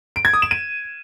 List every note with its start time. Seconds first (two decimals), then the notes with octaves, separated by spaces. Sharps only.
0.16 D7
0.25 G#6
0.33 D#6
0.42 E7
0.51 D#7